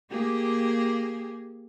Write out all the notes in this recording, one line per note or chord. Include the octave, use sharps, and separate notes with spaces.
A#3 G4 G#4